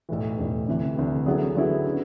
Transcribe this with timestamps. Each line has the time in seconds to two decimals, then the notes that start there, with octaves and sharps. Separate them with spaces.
0.09 B1 A2 E3
0.38 B1 A2 E3
0.67 D2 C3 E3
0.96 D2 C3 E3
1.26 D3 F#3 B3 E4 G#4
1.55 D3 F#3 B3 E4 G#4
1.85 C#3